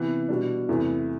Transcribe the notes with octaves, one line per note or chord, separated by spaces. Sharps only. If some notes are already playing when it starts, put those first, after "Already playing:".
Already playing: C3 E3 B3
B2 G3 D4
E2 C3 E3 A3